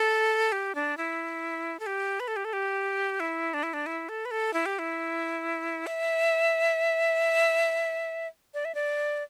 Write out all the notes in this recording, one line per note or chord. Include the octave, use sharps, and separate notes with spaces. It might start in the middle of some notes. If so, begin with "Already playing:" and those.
Already playing: A4
G4
D4
E4
A4
G4
B4
A4
G4
A4
G4
E4
D4
E4
D4
E4
A4
B4
A4
E4
G4
E4
E5
D5
E5
D5